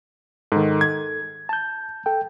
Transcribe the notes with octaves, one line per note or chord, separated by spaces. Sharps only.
G#2 D#3 A4
G#6
A5 G6
A4 G5